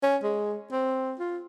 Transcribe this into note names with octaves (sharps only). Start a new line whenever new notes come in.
C#4
G#3
C4
F4